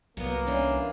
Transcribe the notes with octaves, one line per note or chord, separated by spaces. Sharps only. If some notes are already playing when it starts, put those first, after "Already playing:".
C2 F#3 A#3 B3
E3 C#4 D4